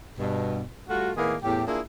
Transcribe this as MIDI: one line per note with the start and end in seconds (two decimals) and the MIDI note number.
0.18 0.61 43
0.18 0.61 47
0.89 1.11 55
0.89 1.11 57
0.89 1.11 65
0.89 1.11 66
1.17 1.35 45
1.17 1.35 51
1.17 1.35 58
1.17 1.35 59
1.17 1.35 64
1.17 1.35 68
1.43 1.63 40
1.43 1.63 45
1.43 1.63 67
1.67 1.80 58
1.67 1.80 62
1.67 1.80 64
1.67 1.80 65
1.67 1.80 68